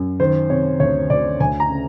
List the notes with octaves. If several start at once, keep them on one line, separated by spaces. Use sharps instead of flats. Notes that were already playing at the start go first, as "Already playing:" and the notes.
Already playing: F#2
D#3 C5
C3 C#5
D2 C#5
D2 D5
D2 G#5
A#5
C#3